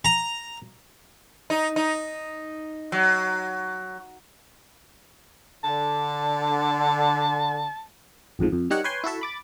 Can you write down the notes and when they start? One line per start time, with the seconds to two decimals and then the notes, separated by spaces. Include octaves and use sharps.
0.05 A#5
1.50 D#4
1.76 D#4
2.92 F#3
5.64 D3 A5
8.39 A1 F2 G#2 F3
8.52 F2
8.70 G3 D#4 G4 A#4 C#5 F#5
8.84 B4 C#5 G5 G#5 C6
9.04 E4 F#4 A4 E5
9.21 B5 D6 A6